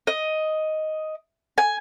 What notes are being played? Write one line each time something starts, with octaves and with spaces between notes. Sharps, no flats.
D#5
G#5